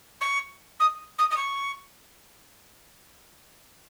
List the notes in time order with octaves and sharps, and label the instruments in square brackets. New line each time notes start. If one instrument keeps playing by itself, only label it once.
[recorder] C#6
D#6
D#6
D#6
C#6